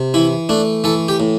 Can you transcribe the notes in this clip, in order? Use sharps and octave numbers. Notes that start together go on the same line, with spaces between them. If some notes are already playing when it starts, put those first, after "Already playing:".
Already playing: C3
E3 E4
A3 D4
E3 A4
G4
A2